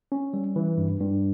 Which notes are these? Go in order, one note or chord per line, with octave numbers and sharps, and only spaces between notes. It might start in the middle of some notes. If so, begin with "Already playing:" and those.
C#4
G3
E3
G2
G2